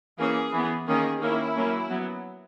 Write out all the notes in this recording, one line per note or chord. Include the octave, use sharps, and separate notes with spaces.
E3 A#3 C#4 G#4
E3 B3
D#3 A#3 C#4 G#4
D#3 A#3 C#4 E4
F#3 A#3 C#4
F#3 B3